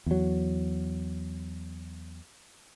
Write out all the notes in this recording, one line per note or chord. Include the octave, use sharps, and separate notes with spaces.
E2 F#3